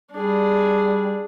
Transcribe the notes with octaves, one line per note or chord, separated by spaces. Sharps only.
G3 D4 G#4